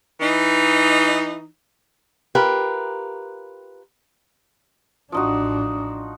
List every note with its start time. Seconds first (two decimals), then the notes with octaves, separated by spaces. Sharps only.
0.21 E3 D#4
2.35 F4 G4 A#4 B4
5.12 A1 F3 D4 D#4 F#4